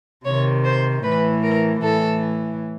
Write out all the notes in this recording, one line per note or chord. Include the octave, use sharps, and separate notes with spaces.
C3 D#3 C#5
C5
A2 E3 B4
A#4
A2 E3 A4